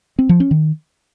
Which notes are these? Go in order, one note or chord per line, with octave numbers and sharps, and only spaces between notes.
C4
F3
C#4
D#3